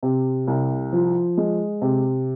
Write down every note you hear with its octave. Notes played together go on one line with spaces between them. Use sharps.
C3
C2
F3
G#3
C3